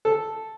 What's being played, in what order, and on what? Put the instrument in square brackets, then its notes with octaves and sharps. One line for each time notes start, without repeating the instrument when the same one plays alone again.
[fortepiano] A4